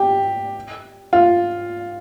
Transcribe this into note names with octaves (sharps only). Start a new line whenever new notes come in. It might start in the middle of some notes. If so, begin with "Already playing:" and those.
Already playing: G4
F4